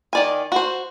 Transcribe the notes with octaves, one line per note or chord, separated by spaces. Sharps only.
D#3 D5 G#5
F#4 C5